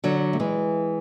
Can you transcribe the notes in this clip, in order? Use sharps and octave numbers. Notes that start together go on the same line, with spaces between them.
D3 F#3
A3
E3 G#3